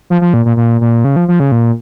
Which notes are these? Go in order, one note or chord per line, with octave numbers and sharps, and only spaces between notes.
F3
F3
A#2
A#2
A#2
A#2
C#3
F3
F3
C#3
A#2